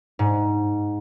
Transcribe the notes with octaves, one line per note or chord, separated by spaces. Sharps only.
G#2